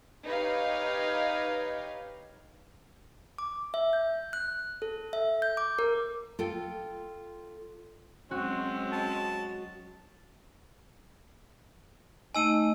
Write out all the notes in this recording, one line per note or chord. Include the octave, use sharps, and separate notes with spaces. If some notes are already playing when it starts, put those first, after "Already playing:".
D#4 G4 B4 C#5 F5
D6
E5
G6
F#6
A4
E5
G6
D6
A#4
F4 A4 G5
F#3 G#3 C4 C#4 F#4
A5
A3 D#4 D#5 G#5 E6 D#7